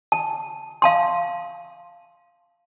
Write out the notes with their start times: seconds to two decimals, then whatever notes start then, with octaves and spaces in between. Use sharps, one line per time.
0.12 A5
0.82 F5 A5 C6